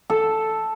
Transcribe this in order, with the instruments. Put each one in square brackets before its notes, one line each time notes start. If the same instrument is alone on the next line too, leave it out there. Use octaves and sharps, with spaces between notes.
[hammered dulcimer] A4